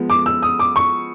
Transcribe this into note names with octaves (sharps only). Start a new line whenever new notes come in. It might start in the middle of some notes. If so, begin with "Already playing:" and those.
Already playing: F3 G#3 B3
D6
E6
D#6
D6
C#6